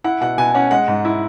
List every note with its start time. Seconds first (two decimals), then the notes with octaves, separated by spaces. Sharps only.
0.04 E4 F#5
0.21 B2 F#5
0.38 B2 G#5
0.54 C#4 F#5
0.71 G#3 F#5
0.88 G#2
1.05 E4